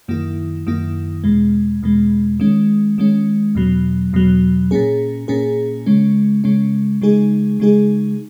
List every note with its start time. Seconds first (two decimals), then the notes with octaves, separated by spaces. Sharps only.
0.08 F#2 D#3 A#3 E4
0.67 F#2 D#3 A#3 E4
1.24 E2 B2 G#3
1.82 E2 B2 G#3
2.40 D#3 G#3 C#4
2.98 D#3 G#3 C#4
3.55 E2 B2 F#3
4.13 E2 B2 F#3
4.71 A#2 A#3 C#4 G#4
5.28 A#2 A#3 C#4 G#4
5.86 C#3 G#3 C#4
6.44 C#3 G#3 C#4
7.01 C#3 G#3 D#4 G#4
7.60 C#3 G#3 D#4 G#4